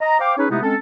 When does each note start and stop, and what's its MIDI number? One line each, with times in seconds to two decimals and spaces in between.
0.01 0.17 75
0.01 0.17 82
0.20 0.34 72
0.20 0.34 77
0.20 0.34 79
0.20 0.34 86
0.38 0.47 61
0.38 0.47 63
0.38 0.47 68
0.38 0.47 71
0.38 0.47 73
0.50 0.59 48
0.50 0.59 56
0.50 0.59 57
0.50 0.59 59
0.50 0.59 63
0.50 0.59 64
0.62 0.75 56
0.62 0.75 60
0.62 0.75 61
0.62 0.75 69